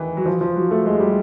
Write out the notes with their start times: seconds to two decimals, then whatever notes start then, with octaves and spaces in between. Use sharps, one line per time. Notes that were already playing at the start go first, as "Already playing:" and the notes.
Already playing: D#3 E3
0.17 F#3
0.26 F3
0.41 F3
0.56 F#3
0.71 A3
0.86 G#3
1.00 G3